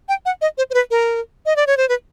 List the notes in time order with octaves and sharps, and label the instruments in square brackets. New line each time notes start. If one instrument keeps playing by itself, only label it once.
[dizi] G5
F#5
D#5
C5
C5
B4
A#4
D#5
D5
C#5
C5
B4